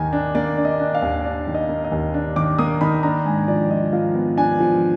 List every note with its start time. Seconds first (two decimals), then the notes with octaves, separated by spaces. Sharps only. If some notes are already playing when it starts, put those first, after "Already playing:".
Already playing: D#2 D#3 A#3 G#5 A#5
0.13 D4
0.35 A#3 D5
0.57 D4
0.65 D#5
0.80 D4
0.95 F5
1.02 D#2
1.24 D4 D5
1.47 D#3
1.54 D#5
1.69 A#3
1.84 D#5
1.92 D#2
2.14 D4
2.36 D#3 D6
2.59 A#3 D#6
2.81 D#3 B5
3.03 D4 A#5
3.25 G#2 G#5
3.48 F3 D5
3.70 F3 D#5
3.93 F3 F5
4.15 B3
4.37 D4 G#5
4.60 F3